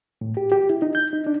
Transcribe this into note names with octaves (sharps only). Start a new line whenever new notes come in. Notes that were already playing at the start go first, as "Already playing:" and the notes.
A2
G4
G4
E4
D#4
G6
D#4
D4